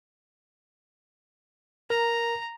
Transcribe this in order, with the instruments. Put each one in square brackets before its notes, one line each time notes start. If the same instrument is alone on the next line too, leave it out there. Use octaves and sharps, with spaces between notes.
[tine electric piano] A#4 [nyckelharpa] A#5